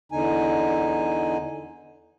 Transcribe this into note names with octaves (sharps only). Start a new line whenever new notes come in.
E2 D3 D#4 G#5